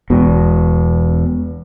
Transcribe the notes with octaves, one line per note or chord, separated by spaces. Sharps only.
E1 B2